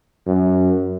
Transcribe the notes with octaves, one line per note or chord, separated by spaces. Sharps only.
F#2